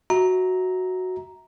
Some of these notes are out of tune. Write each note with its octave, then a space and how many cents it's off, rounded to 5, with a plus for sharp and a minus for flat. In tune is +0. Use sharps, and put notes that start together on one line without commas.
F#4 +0 E5 -25 A#5 +0